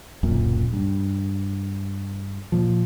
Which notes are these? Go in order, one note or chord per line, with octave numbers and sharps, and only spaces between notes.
D1 B1 F#2 A#2
G2
A#2 F3